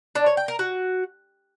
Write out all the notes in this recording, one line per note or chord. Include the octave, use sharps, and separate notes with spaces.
D4
C#5
G5
A#4
F#4